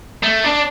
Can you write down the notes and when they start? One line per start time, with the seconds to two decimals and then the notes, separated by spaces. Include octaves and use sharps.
0.23 A3
0.44 D4